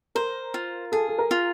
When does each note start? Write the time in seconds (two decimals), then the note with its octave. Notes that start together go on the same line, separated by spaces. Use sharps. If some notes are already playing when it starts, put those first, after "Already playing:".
0.15 A#4 C5
0.54 F4
0.92 G#4 A4
1.09 A4
1.18 A#4
1.31 F4